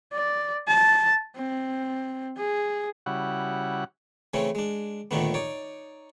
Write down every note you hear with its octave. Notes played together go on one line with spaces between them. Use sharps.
D5
A5
C4
G#4
C#3 G3 E4 F#4 F#5
C#3 E3 A3 C4 C#4
G#3 D4
D#2 A#2 D3 D#3 A3 B3
D#4 C#5 D5